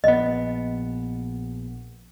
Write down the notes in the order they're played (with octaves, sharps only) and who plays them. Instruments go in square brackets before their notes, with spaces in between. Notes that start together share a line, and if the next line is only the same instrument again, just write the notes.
[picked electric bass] A#1 B3 [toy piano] D#5